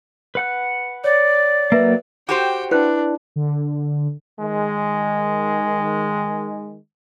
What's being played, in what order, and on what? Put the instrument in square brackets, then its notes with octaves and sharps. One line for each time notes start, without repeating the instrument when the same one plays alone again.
[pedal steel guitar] B4 F#5 F#6
[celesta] C#5 [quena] D5
[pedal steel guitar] F#3 A#3 [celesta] B4 E5
[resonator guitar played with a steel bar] F#4 G4 C5 [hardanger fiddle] G5 [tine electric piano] D6
[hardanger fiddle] D4 [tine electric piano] E4 [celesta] B4 F#6
[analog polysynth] D3
[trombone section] D#3 G#3